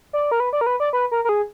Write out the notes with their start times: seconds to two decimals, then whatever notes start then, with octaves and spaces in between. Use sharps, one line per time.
0.13 D5
0.31 A#4
0.40 B4
0.53 D5
0.61 A#4
0.67 B4
0.80 D5
0.93 B4
1.11 A#4
1.25 A#4
1.29 G#4